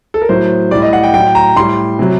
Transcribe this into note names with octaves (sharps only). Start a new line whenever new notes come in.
A4
A#4
A2 F#3 C5
A2 G3 D5
D#5
F#5
G5
A2 F#3 G5
A#5
A2 G3 C6
C3 F#3